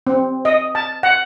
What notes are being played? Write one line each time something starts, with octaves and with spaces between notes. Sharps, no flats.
C4
D#5
A5
F#5